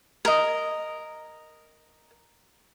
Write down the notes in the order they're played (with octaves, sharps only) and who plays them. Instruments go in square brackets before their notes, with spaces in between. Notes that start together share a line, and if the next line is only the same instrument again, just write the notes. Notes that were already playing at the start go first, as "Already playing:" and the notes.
[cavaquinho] A#4 D#5